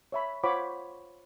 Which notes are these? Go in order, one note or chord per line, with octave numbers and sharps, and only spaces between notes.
C#5 E5 B5
F4 C5 C#5 F#5 B5 D6